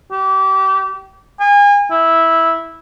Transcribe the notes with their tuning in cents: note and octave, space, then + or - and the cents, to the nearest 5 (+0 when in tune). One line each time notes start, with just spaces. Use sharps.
G4 -30
G#5 -35
E4 -10